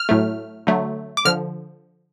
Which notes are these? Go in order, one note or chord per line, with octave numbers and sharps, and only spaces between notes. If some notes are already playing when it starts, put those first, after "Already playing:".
Already playing: F6
A2 F#3 A3
D3 F#3 A3
D6
D3 F3 F6